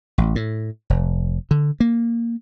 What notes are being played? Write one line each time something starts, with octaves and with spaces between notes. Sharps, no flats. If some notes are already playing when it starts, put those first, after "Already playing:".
A1
A2
F1
D3
A#3